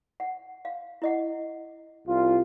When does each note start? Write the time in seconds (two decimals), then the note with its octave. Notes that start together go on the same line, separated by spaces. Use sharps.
0.20 F#5
0.65 F5
1.02 E4 D#5 F#5
2.07 C2 F4